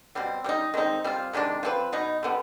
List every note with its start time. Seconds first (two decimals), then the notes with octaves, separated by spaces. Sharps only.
0.15 B2 G3 C4
0.44 G3 C4
0.49 D#4
0.74 D#3 G#3 C4 D#4
1.04 G3 C4 F4
1.33 C3 D#3 G#3 D4
1.63 F3 C4 D#4 B4
1.92 B2 B3 D#4
2.23 D3 G3 B3